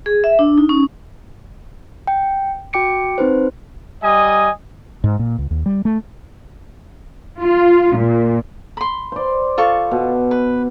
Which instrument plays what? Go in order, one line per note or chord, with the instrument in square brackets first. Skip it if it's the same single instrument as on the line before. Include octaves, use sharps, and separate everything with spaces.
[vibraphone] G#4
E5
D4
D#4
C#4
[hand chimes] G5
F#4 G5 D6 C#7 D7
C4 D#4 B4 C5
[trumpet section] G3 D#5 G#5 D#6
[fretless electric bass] G#2
A#2
C#2
D#2
G3
A3
[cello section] F4
A#2
[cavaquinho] B5 C6
[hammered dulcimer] C5 D5
[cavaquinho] F4 A4 C#6
[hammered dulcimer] B2
[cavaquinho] B4